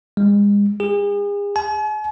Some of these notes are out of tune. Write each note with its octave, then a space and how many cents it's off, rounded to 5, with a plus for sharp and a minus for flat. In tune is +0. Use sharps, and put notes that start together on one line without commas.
G#3 -35
G#4 -40
G#5 +45